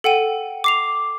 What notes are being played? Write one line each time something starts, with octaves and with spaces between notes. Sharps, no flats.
A4 F#5 G5 D#7
D6 C7 F7